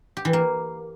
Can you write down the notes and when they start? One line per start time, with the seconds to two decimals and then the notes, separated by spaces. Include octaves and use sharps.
0.17 G4
0.25 E3
0.33 A#3